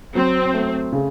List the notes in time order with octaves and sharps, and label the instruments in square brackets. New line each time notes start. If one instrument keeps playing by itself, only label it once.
[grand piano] F#3 [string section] C4
[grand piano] A3
C#3